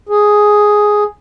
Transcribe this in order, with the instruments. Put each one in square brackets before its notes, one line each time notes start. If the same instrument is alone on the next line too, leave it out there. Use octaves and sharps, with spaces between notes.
[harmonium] G#4